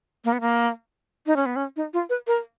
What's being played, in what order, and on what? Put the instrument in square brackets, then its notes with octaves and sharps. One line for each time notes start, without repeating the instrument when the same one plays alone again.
[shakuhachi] A#3
B3
A#3
D#4
C#4
B3
C#4
D#4
F4
B4
A#4